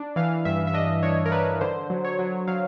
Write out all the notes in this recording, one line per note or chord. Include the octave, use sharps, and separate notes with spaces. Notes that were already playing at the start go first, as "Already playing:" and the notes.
Already playing: D4
E3 F5
G2 E5
E5
D4 D#5
D4 C#5
A#4
D4 B4
D3 C5
F#3
C#5
F#3
F#3 F5